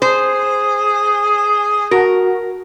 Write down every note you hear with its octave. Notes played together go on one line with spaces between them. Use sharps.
G#4 C5
F#4 A#4